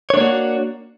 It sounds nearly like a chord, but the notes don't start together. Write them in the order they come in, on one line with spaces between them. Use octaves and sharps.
C#5 D4 A#3 F#4